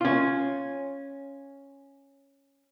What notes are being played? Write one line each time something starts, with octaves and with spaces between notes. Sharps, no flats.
C#4 F4